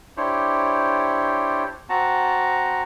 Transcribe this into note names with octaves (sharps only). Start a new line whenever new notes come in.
D4 E4 G4 C5 C#5
C4 F#4 F#5 A5 A#5